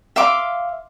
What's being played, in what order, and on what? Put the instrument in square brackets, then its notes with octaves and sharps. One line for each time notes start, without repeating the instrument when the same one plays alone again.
[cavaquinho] E5 F5 C6 D6